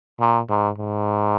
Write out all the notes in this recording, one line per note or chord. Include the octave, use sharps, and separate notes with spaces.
A#2
G#2
G#2